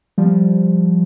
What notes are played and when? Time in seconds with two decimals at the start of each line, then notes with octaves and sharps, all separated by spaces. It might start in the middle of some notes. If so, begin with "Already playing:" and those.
0.18 F3 G3